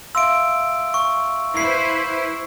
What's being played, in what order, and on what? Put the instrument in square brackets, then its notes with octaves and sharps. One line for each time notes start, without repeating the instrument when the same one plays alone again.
[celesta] E5 F5 C6 [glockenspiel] E6 D7
[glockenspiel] C#6
[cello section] E4 B4 C5 [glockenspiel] C7